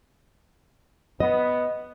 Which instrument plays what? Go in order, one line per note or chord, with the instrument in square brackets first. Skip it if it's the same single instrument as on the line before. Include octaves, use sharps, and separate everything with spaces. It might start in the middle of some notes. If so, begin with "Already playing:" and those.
[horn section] B3 [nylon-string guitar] D#5